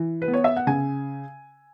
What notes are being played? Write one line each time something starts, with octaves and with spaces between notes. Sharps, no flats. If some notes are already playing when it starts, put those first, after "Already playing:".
Already playing: E3
B4
B3
C#5
E5
F#5
C#3 G#5